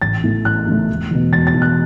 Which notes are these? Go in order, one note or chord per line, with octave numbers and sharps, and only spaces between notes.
A1 A6
A2 E3 A3
A1 F#6
A2 E3 A3
E1
E2 B2
E1 A6
A6
E2 B2
F#6